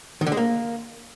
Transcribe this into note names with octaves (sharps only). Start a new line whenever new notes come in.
D#3
D3
G#3
A#3